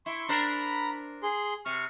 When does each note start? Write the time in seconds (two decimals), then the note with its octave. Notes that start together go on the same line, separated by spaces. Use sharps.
0.06 E4 C6 C#6
0.29 D4 A#4 C5 A#5 B5
1.23 G#4 C6
1.66 C3 C#6 F6